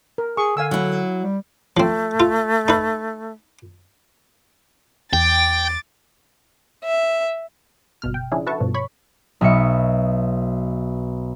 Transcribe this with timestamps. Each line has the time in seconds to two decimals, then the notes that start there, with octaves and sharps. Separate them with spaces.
0.18 A#4
0.37 G#4 C#6
0.57 D3 F5 G#5 E6
0.71 F#3 E4
1.23 G3
1.77 F3 A3 C4
2.20 F4
2.68 D#4 B4
5.13 E2 G5 D6 A6
6.84 E5
8.02 G1 B2 F6
8.14 G5
8.31 C#3 F3 C#4 D4 E4 G#4
8.46 E4 F#4 A4 B4 A5 C#6
8.60 G2 B2 F3
8.74 C#5 B5 C#6
9.41 B1 B2 E5 C#7